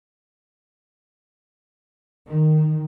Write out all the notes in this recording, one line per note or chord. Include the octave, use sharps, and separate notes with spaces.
D#3